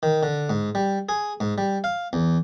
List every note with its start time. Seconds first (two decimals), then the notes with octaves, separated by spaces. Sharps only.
0.03 D#3
0.23 D3
0.49 G#2
0.75 G3
1.09 G#4
1.40 G#2
1.58 G3
1.84 F5
2.13 E2